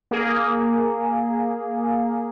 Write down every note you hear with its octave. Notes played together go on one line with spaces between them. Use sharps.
A#3 G#4